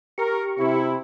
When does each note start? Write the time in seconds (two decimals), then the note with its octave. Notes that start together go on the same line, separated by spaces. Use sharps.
0.18 G4 A#4 C#6
0.58 C3 E4